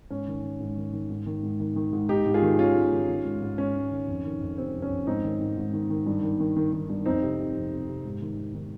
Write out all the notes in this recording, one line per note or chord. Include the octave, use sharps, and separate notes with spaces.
G#2 C#4
D#3
D#3
G#2
D#3
D#3
G#2
D#3
G#2
D#3
D#3
G#2
G#2 D#4 G4
G#2
F4 G#4
D#3
D#3 C#4 F4
G#2
D#3
D#3
G#2
G#2
G#2 C#4
G#2
D#3
F2
D#3
F2
C3 C4
F2
C#4
F2
G#2 C4 D#4
D#3
G#2
G#2
D#3
D#3
G2
D#3
D#3
D#3
D#3
G2
F2 C4 D#4
C3
C3
F2
C3
C3
G#2
D#3
D#3
D#3